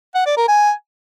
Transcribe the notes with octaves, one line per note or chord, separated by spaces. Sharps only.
F#5
D5
A#4
G#5